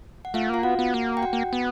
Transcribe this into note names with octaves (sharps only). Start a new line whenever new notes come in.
F#5
A3 F4 F5
A#3 F4 F5
B3 F#4 F#5
B3
A#3
G5
F#4 F#5
A#3
B3